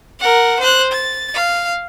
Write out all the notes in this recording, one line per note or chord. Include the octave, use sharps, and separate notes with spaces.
A#4 F#5
C5 F#6
A6
F5